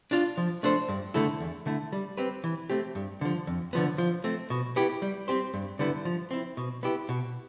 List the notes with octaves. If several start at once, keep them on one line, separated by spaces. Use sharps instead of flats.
D4 F4
F3
A3 D4 A4 C5
G2
D3 A3 E4 A4
E2
D3 A3 E4
G3
C4 G4 B4
E3
A3 C4 G4
G2
D3 F3
F2
D3 F3 B3
F3
A3 C4
B2
B3 E4 G4
G3
C4 G4 C5
G2
D3 G3 B3 E4
F3
C4 E4
B2
B3 E4 G4
B2